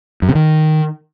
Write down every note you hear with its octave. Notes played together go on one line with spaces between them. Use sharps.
F#2
C3
D#3